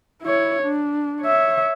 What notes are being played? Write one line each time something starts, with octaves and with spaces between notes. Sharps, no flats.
E4 C#5
D4
C#5 E5